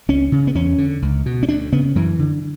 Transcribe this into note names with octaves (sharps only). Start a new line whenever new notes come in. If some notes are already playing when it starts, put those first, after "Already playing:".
C#2 C#4
C#3
B3
E2 C#4
D3
C#2
B2
C#4
D2 D4
C#3 B3
F#2 E3
D3